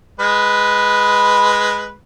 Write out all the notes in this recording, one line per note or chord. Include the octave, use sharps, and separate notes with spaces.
G#3 B4